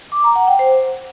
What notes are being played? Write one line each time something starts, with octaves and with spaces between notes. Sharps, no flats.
D6
A#5
F#5
G5
C5